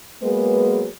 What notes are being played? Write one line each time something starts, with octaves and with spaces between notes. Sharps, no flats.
F#3 G#3 A#3 B3 G#4 B4